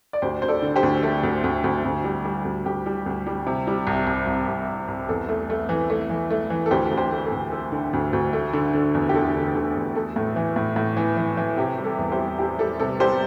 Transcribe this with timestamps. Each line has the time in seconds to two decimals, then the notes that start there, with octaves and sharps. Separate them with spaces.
0.13 D5
0.22 D2 G4 C5
0.42 D2 C5
0.48 A4 D5
0.62 D3
0.76 G4 C5
0.83 D2
1.03 A3 A4
1.23 D2
1.44 D2
1.64 D2
1.85 D2
2.04 G3
2.25 G3
2.45 D2
2.65 D2 G4
2.86 G3
3.06 D2
3.27 G3
3.46 C3
3.67 G3
3.87 C2
4.07 C2
4.27 C2
4.48 C2
4.69 C2
4.88 C2
5.09 E2 A4
5.29 A3
5.50 A3
5.69 E3
5.90 A3
6.10 E3
6.31 A3
6.50 E3
6.66 A4
6.71 D2 G4 C5
6.91 D2
6.98 G4 C5
7.11 A3
7.25 A4
7.32 D2
7.52 A3 A4
7.72 D3
7.93 D2
8.13 D2
8.33 A3
8.53 D3
8.74 D3
8.94 E2
9.09 G4
9.14 D3 A4
9.35 D3
9.55 D3 G4
9.75 E2
9.96 A3 A4
10.16 A2
10.36 E3
10.56 A2
10.76 A2
10.97 E3
11.17 E3
11.37 E3
11.57 C3 G4
11.78 G3
11.84 A4
11.98 E2
12.12 G4 C5
12.19 G3
12.38 G3 G4
12.59 G3 A4
12.80 C3 A4
13.00 G3 G4 C5